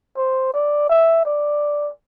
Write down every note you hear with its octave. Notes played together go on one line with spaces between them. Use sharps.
C5
D5
E5
D5